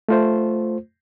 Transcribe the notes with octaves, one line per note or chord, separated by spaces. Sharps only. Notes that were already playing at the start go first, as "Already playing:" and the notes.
A3 F4 C5